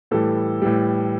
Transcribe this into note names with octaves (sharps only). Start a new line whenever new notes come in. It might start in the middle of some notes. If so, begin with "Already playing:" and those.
A2 E3 G3 A4
A2 E3 G3